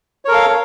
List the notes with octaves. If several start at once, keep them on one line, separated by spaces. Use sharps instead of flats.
A4 A#4 C#5 F5